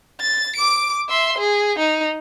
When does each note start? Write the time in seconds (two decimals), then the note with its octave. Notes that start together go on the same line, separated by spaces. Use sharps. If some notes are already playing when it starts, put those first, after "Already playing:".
0.20 A6
0.56 D6 D7
1.09 E5 C6
1.38 G#4
1.79 D#4